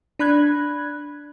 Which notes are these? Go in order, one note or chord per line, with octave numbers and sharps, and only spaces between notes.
D4 B5 F#6 G#6